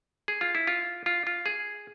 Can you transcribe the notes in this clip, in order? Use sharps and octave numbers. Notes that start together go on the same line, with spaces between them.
G#4
F4
E4
F4
F4
F4
G#4